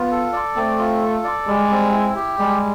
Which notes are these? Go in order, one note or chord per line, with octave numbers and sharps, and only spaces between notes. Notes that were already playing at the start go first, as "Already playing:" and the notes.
Already playing: B3 F4
A4
D5
A3 C4
F4
A4
D5
G3 G#3
C4
E4
G4
G3 G#3